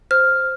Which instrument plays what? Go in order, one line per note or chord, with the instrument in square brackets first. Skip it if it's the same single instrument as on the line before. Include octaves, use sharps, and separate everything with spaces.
[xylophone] C5 F6